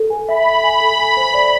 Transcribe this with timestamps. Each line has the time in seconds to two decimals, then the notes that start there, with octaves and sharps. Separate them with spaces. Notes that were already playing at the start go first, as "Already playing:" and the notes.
Already playing: A4
0.10 G#5
0.28 E5 B5
0.46 E5
0.63 G#5 B5
0.81 A4
0.99 G#5
1.17 C5
1.34 D5